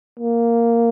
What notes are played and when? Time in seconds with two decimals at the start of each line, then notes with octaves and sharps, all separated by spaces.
0.19 A#3